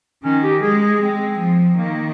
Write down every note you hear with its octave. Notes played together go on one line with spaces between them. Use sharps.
D#3 C#4
G4
G#3 G#4
G#4
G#3 C4
F3
D#3 A#3